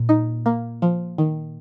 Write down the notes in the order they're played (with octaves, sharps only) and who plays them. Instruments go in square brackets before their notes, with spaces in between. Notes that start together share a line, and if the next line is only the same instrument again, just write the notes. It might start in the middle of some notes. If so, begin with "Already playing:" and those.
Already playing: [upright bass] A#2
[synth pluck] D#4
A#3
F3
D#3